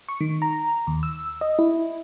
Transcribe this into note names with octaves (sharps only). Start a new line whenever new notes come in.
C#6
D#3
A#5
D#2
E6
D#5
E4